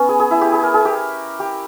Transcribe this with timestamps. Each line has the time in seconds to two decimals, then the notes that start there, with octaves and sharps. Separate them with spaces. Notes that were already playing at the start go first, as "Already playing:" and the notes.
Already playing: B3 C#4
0.09 G#4
0.20 G#4
0.31 E4
0.41 G4
0.52 G#4
0.63 A#4
0.74 G#4
0.85 G4
1.40 G4